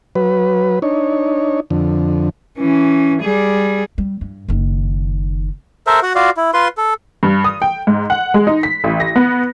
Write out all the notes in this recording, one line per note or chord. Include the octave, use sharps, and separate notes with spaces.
F#3 B4
D4 D#4 C#5
F2 D3
E3 C#4
G3 G#4
G3
G2
F#1 D#3
A4 A#4 C5 E5
F#4 F#5
F4 F#4 D5 F5
E4
F4 B4 C6
A4
G2
D#6
G5
G#2
F#5
G#3
D#4
B6
A1
A#6
B3